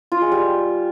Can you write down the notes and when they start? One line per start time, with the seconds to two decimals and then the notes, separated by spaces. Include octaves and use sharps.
0.12 F4
0.22 G#3
0.32 G3